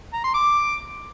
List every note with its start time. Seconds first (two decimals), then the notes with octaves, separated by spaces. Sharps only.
0.14 A#5
0.24 C6
0.34 D6